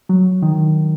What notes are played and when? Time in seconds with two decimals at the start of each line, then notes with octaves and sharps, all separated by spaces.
0.09 F#3
0.43 D#3